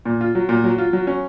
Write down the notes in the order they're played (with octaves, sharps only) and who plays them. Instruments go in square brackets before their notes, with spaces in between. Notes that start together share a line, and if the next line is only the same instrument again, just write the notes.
[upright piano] A#2
F4
F#3
A#2
F#3
F4
F#3
C#4